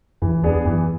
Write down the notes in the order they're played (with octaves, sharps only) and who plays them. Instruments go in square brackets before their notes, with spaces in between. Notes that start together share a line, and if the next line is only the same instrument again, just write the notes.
[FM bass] F#2 [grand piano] E3
[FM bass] E2 [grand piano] B3 D4 G#4
[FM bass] F#2 [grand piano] E3